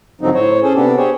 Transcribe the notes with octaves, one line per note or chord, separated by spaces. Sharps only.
G#2 D3 F3 F#3 C4 D#4
A2 C5 C#5
C#4 G#4 A4 C5
C3 B3 D4 G4 A4
G4 G#4 C5 C#5